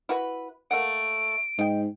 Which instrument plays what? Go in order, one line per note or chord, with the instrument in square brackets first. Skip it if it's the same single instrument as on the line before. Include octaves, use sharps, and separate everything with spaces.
[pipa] E4 F#4 B4
[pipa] A3 A#3 F#5 [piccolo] D7
[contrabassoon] G#2 [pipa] D#4 G5